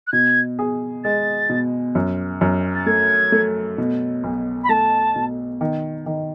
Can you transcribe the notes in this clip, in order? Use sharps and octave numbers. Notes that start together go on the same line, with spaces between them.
F#6
B2 G#6
G#4
G#3 A6
B2
F#2
F#2
A6
A3 G#6
A3
B2
B1
B5
A3 A5
B2
D#3
D#3